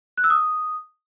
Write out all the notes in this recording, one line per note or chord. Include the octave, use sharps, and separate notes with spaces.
F#6
E6
D#6